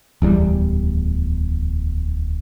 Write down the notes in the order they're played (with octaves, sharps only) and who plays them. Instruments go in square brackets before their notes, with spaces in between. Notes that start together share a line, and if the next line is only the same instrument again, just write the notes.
[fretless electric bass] D1 E2 G3